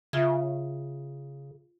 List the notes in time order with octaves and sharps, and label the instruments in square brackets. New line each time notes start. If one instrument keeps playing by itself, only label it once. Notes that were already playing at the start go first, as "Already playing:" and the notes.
[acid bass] C#3 [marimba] F4 E5 G#6